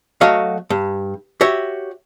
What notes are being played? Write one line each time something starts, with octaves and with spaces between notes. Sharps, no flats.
F#3 A3 F#4 C#5 D#5 F5
G2
F#4 G4 C#5 E5